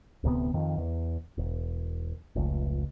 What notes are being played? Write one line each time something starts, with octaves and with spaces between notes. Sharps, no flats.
D1 D2 C3 B3
F2 D#3
E2
E1
F1 C#2